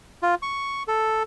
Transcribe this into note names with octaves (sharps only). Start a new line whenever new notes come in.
F4
C#6
A4